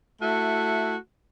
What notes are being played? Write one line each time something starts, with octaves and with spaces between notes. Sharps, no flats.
A3 E4 F#4